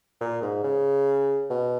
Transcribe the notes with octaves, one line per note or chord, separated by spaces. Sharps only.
A#2
G#2
C#3
B2